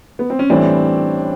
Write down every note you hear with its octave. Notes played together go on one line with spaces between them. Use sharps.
B3
C4
C#4
A2 E3 G3 C4 D4